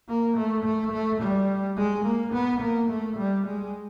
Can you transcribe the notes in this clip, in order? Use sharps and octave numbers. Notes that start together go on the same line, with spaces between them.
A#3
A3
A3
A3
G3
G#3
A#3
B3
A#3
A3
G3
G#3